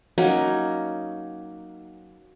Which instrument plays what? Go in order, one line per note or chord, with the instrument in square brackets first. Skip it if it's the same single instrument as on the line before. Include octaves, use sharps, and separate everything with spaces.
[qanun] F#3 A#3 C#4 D#4